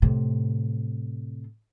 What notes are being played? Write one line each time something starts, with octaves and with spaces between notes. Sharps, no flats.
A2 C3